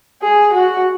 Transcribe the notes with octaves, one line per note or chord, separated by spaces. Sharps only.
G#4
F#4